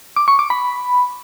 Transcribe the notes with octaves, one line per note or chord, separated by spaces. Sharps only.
D6
C#6
D6
B5